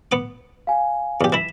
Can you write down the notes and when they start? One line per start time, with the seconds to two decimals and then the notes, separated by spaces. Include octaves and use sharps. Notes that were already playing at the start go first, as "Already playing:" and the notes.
0.12 B3 D6
0.67 F5 G#5
1.21 E2 G4
1.32 E3 E4 B6 E7